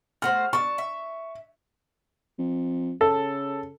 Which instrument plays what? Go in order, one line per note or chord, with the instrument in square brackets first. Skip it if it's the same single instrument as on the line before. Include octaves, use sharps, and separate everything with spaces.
[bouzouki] A3 F#4 C5 [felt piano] F6
[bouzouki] D4 A5 [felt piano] C#6
[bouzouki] E5
[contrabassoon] F2
[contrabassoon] C#3 [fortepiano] A4